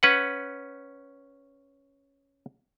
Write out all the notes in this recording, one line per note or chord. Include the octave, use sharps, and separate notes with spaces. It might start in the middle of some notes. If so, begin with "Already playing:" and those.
C#4 B4 F#5